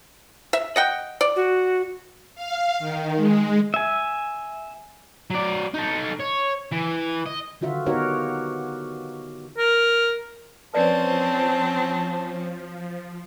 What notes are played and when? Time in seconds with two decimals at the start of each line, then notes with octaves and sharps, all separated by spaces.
0.53 E5
0.76 D#5 F#5 G5
1.21 D5
1.36 F#4
2.35 F5
2.79 D#3
3.16 G#3
3.74 E5 G#5
5.30 F#3 D5
5.74 D#4 A4
6.20 C#5
6.72 E3
7.26 D#5
7.61 D3 D#3 F4 F#4 E5
7.86 B3 D#4 F#4 G4 A#4 C#5
9.58 A#4
10.74 F3 C4 C#4 B4 C5 D5 A5